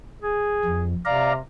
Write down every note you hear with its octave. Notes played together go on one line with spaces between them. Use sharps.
G#4
F2
C3 D5 F5 A#5